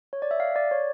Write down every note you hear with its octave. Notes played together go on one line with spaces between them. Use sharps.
C#5
D5
E5
F5
D5
C#5